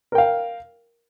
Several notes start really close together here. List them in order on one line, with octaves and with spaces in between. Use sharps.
A#4 G5 F5